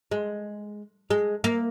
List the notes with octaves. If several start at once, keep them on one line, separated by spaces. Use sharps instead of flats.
G#3
G#3
A#3